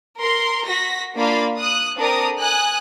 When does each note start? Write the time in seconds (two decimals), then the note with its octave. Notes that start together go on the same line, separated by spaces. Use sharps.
0.19 A#4 C6
0.67 F#4 A#6 B6
1.16 A#3 D4 F4 F5 B5
1.58 D#6 F#6
1.96 C4 D4 A4 A#4 A#5 D#6
2.38 G#5 D#6 F#6